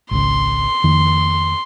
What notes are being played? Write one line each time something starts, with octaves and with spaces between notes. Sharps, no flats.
G#1 C#2 C#3 C6
F2 D#3 A#3